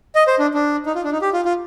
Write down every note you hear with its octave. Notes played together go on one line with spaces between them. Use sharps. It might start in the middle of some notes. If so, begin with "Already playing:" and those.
D#5
C5
D4
D4
D#4
F4
D4
D#4
G4
F4
F4